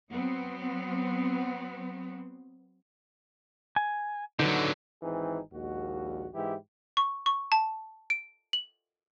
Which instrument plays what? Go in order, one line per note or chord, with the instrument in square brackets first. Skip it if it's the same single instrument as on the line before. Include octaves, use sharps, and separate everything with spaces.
[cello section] F#3 B3 C4
[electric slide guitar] G#5
[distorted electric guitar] D3 F#3 [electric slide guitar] D#4 B4
[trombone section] G#1 E3 C4 D#4 G#4
A#1 D#2 G#3 F#4
G#2 E3 E4 G4
[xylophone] C#6
C#6
A5
D7
F#7